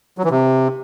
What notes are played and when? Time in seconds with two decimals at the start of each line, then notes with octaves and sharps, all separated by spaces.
0.18 F#3
0.24 E3
0.31 C3